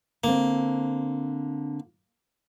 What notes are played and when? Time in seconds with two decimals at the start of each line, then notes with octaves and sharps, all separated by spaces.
0.24 D3 A#3 C4